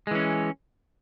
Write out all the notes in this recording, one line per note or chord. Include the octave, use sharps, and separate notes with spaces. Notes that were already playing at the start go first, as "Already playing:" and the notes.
E3 G#3 C#4